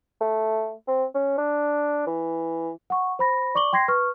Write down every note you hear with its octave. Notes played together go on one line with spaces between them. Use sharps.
A3
C4
C#4
D4
E3
F#5 C#6
C5 B5 A#6
D5 C#6 D6 F#7 G7
G5 C6 G#6 A#6 C7
B4 C#6 F6